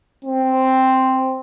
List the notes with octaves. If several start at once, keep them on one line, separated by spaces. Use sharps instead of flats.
C4